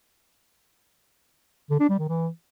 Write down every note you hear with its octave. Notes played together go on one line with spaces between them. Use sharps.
D3
D4
G3
D#3
E3